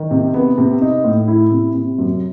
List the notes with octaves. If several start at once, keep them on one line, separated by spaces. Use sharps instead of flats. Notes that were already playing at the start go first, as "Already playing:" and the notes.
Already playing: D#3
C3
B3
C3
D#4
A2
E4
C3
C3
F#2